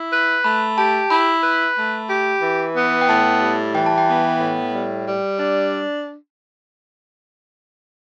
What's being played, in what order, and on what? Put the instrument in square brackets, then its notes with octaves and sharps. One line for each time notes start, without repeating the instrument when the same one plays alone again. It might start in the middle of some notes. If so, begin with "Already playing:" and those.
Already playing: [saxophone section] E4
B4
[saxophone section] A3 [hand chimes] B5
[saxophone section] G4 [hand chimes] A5
[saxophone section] E4 [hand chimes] B5
[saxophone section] B4
A3
G4
E3
B3
[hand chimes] G5
[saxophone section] A2 [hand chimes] A5
[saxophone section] G3
[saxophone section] E3 [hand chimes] G5
[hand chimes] A5
G5
[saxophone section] B3
A2
G3
G3
D4